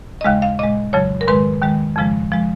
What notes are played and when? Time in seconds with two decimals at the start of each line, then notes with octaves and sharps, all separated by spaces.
0.21 D#5
0.24 D#2 C#3 G#3 F5
0.42 F5
0.59 A#2 G#3 D#5
0.93 F2 C#3 F#3 C#5
1.21 A#4
1.28 G#2 D#3 G#3 B4
1.62 D#2 D#3 G#3
1.96 F2 C#3 F3 G#3
2.32 F3 G#3